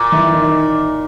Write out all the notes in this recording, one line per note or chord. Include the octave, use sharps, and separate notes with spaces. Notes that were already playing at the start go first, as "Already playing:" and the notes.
Already playing: A#2
E3 E4
D#3 D#4